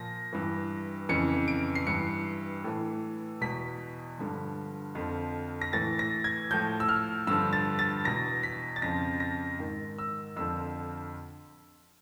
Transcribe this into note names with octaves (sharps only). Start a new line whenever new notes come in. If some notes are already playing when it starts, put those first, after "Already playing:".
Already playing: A#2 F3 A#6
G2 E3
F2 C#3 E3 C#7
D7
C7
G2 E3 C#7
A2 E3
E2 B2 B6
G2 D3 F3
F2 D3 F3
A#6
A2 E3 A6
A#6
G#6
A2 F3 G6
E6
F6
G2 D3 F3 E6
A6
A6
E2 B2 A#6
B6
A6
F2 C#3 F3 A#6
A#6
G#2 D#3
E6
F2 D3 F3 E6